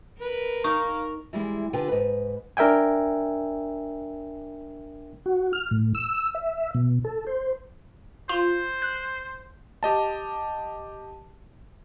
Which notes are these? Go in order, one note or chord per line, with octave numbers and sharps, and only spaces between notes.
A#4 B4
D#4 F5 A#5 C#6
E3 G3 G#3 E4
D3 F4 G4 B4 G5 G#5
G#2 B4
D4 A#4 E5 G5 G#5
F#4
F6
A2
E6
E5
B2
A4
C5
F4 C5
F#6
G4 D#5 A5